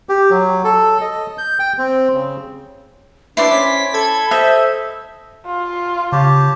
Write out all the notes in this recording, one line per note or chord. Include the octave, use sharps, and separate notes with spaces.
G4
F#3
A4
D#5
G6
G5
C4
C#3
D4 E4 B4 C5 D5 C7
C#4 C#5 B6
A4 B5 G#6
C5 D#5 E5
F4
C#3 G4 C#5 A5